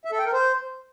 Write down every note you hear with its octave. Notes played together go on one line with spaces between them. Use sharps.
E5
A4
G5
A#4
C5